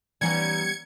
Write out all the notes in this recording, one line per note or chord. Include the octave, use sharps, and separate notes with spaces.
E3 G3 B3 C#4 D#4 G#5 G#6 C#7